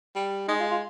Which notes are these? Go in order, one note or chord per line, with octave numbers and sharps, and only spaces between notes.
G3
G#3 D#4
F4
F4